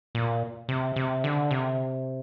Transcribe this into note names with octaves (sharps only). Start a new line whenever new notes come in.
A#2
C3
C3
D3
C3